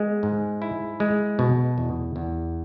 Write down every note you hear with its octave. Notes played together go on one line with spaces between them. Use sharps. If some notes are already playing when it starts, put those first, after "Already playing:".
Already playing: G#3 B3
G#2
E4
G#3
B2
E2
E2